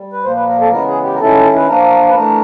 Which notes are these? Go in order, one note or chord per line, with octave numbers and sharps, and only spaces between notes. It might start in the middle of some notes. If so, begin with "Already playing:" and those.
Already playing: G3
B4
A#2 F3 A#3 C5
B4
A#4
A4
C#3 E3 G#3 B3 A#4
G#4
G4
A#4
D#3 G#3 C#4 E4 A4
B4
F3 A#3 D4 A#4
B4
E3 A3 D4 A#4